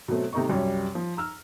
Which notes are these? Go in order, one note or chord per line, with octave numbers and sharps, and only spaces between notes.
B2 F#3 A3 C4
C3 A3 D#4 D#5 C#6
C2 F#2 G3 C#5
F3
A#5 E6 F6